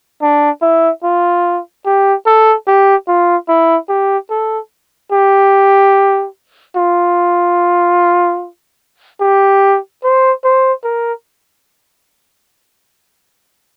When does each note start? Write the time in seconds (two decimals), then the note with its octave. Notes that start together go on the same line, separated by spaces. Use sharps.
0.21 D4
0.61 E4
1.03 F4
1.85 G4
2.26 A4
2.67 G4
3.08 F4
3.48 E4
3.89 G4
4.30 A4
5.12 G4
6.76 F4
9.21 G4
10.04 C5
10.44 C5
10.84 A#4